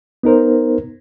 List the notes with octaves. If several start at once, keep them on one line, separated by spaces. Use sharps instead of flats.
B3 D#4 A#4 C5